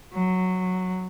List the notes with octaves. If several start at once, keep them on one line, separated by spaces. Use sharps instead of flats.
F#3